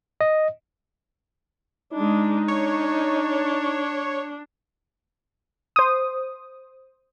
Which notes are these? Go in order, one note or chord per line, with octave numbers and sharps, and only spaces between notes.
D#5
G#3 D4 D#4
D4 C#5
C5 D#6